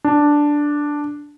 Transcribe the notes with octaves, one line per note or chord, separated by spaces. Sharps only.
D4